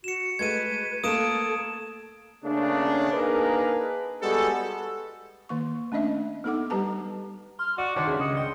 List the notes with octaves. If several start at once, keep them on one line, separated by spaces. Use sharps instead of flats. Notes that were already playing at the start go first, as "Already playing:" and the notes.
F#4 C#7 E7
G#3 A3 B4 G#6 D#7
A3 A#3 A4 D#6 D7 E7
C#3 A3 A#3 C#4 D4
A#3 D4 D#4 G#4 A#4 B4
G3 G#3 B3 F#4 G#4 A4
D#3 A#3 C#6
A3 C#4 D4 D#5 E5
B3 D#4 A4 F#5 D6
G3 G4 B4 A5 A#5
C6 F6
F#4 D5 F#5 D6
D#3 D4 C#5 C6
C#2 G2 G#4 E5
C#3 D#5 C#7
G5 C6